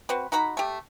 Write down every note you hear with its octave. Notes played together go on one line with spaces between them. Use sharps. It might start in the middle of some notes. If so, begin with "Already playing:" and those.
C4 F#4 B4
D#4 F#4 A#5 B5
A3 G4